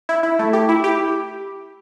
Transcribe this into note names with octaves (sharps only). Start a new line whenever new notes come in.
E4
E4
A3
G4
E4
G4